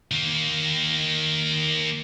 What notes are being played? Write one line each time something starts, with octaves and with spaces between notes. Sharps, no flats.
D#3 A#3